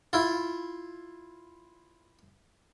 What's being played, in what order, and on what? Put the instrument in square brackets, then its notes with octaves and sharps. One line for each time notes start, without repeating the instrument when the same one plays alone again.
[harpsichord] E4 F4